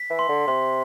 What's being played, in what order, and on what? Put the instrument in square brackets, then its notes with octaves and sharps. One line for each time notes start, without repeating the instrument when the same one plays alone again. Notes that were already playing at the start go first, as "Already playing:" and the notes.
Already playing: [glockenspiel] B6
[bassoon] E3
[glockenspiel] C6
[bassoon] D3
[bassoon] C3 [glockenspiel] C6